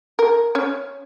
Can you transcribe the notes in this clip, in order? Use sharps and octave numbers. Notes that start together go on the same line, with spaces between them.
A#4
C#4